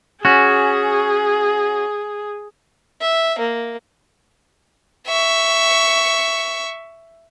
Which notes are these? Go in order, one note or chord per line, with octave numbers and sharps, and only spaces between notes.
C#4 F#4 G#4
E5
A#3
E5 C#6